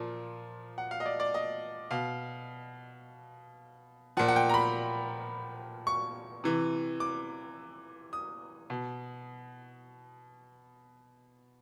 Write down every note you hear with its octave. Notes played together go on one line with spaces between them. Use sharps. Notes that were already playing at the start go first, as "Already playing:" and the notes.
Already playing: A#2 F3
F#5
F5
D#5
D5
D5
D#5
B2 F5
A#2 F3 F#5
F#5
G5
A#5
B5
C#6
C3 E3
D6
D#6
B2